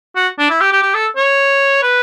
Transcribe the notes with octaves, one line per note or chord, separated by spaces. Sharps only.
F#4
D4
E4
G4
G4
G4
A4
C#5
B4